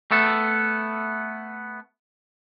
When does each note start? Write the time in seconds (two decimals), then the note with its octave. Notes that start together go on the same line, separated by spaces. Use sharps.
0.11 A3 B3 A4